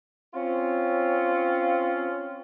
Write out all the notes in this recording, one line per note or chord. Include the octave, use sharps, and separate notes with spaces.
C4 C#4 F4